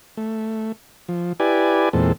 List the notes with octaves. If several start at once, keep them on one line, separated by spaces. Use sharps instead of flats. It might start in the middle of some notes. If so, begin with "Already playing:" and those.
A3
F3
E4 G4 B4 D5 G#5
E2 A#2 G#3 C4 A4